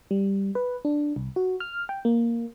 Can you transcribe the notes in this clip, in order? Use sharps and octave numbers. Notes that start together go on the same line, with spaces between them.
G3
B4
D4
C2
F#4
F6
G5
A#3